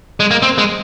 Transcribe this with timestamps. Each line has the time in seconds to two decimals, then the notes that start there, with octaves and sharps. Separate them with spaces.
0.20 G#3
0.31 A#3
0.42 C4
0.58 G#3